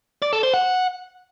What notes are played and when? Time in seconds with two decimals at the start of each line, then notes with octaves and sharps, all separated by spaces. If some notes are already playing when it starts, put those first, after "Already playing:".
0.22 D5
0.33 A4
0.43 C5
0.54 F#5